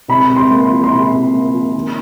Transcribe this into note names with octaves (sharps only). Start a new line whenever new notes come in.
C3 B5
C3
C6
A#3
C6
F3
C6
C3 B5
C3
A#3
F3
D#3